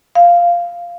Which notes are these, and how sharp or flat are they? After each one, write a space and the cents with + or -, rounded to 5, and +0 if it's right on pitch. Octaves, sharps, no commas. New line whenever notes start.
F5 -5